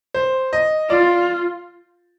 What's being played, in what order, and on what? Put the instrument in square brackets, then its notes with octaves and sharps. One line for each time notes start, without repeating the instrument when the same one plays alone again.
[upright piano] C5
D#5
[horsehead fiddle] F4 [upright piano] D5